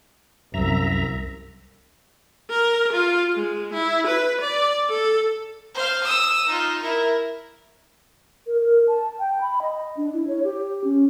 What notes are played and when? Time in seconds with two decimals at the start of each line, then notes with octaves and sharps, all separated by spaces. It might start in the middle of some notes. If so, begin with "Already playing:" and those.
0.54 C2 F#2 E5 A#5
2.50 A#4
2.92 F4
3.34 G#3
3.73 E4
4.07 B4
4.41 D5
4.89 A4
5.75 C5 F5
6.03 D#6 E6
6.48 D#4 F4
6.82 E4 A#4
8.47 A#4
8.62 A#4
8.88 A5
9.19 G5
9.41 B5
9.62 D#5
9.97 D4
10.14 E4
10.28 C#5
10.44 G4
10.84 C#4